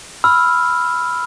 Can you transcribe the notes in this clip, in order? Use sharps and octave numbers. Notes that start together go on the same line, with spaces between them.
B5 E6 F6